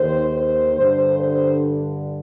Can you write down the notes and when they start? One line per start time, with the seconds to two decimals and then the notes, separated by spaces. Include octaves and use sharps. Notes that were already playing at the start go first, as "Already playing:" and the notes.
Already playing: D#2 D#3 C5
0.33 C5
0.75 G2 D3 C5
1.18 C5